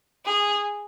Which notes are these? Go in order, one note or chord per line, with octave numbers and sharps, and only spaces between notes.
G#4